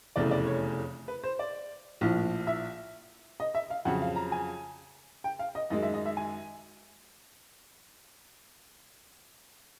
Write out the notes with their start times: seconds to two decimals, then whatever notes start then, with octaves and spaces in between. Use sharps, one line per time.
0.16 F1 E2 C#3 E3 A3 D5
0.31 D5
0.47 C#5
1.08 B4
1.24 C5
1.39 D5
2.01 A#1 A2 F3
2.47 E5
3.40 D#5
3.55 E5
3.70 F5
3.85 F2 C#3 F#3 F#5
4.02 F5
4.16 A#5
4.32 G#5
5.24 G5
5.39 F5
5.55 D#5
5.70 F#2 D#3 G#3 D#5
5.83 E5
5.94 D#5
6.06 E5
6.17 G#5